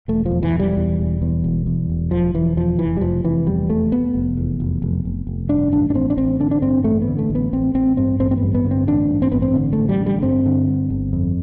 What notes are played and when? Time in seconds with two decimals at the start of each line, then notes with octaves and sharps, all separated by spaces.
0.08 E1 A3
0.25 F3
0.31 E2
0.43 E3
0.53 E1
0.59 G3
0.77 E2
1.00 E1
1.22 E2
1.44 E1
1.66 E2
1.90 E1
2.11 E1 F3
2.34 E1 E3
2.57 E2 F3
2.79 F1 E3
2.97 G3
3.01 F1 F3
3.24 F1 E3
3.47 E2 G3
3.69 F1 A3
3.92 E2 B3
4.15 F1
4.37 E2
4.60 F1
4.82 F1
5.05 F1
5.27 F1
5.49 G2 D4
5.72 A1 D4
5.90 D4
5.94 A1 C4
6.10 D4
6.17 A1 C4
6.40 D3 D4
6.51 D4
6.62 G2 C4
6.84 A1 A3
7.02 B3
7.08 D3
7.19 A3
7.30 A1
7.35 B3
7.53 A1 C4
7.74 A1 C4
7.97 G2 C4
8.20 A1 C4
8.31 C4
8.37 B3
8.43 G2
8.54 B3
8.65 D3
8.71 C4
8.87 A1 D4
9.10 G2
9.22 C4
9.32 A1 B3
9.42 C4
9.55 D3
9.73 A3
9.78 A1
9.89 G3
10.00 D3
10.06 G3
10.23 G2 C4
10.46 D3
10.68 G2
10.90 G1
11.13 F2